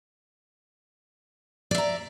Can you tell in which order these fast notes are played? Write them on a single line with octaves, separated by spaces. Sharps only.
D5 E5 A#5